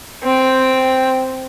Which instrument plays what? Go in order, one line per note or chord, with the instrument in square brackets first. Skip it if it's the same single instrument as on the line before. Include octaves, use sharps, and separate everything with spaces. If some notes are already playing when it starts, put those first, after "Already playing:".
[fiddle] C4 G5